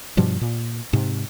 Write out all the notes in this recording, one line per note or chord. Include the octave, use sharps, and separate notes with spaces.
G2 B2 F3 G3
A#2
G#2 C3